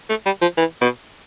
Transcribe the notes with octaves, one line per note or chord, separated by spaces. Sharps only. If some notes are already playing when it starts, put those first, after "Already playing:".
A3
G3
F3
E3
B2